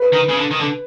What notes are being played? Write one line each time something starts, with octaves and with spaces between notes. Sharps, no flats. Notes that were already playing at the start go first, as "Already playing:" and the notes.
Already playing: B4
D#3
C#3
D3
D#3
D3